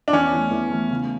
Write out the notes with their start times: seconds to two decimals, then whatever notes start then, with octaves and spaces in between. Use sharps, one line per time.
0.08 D4
0.13 E2 C#4
0.33 E3 A3
0.51 E2
0.70 E3 A3
0.90 C#3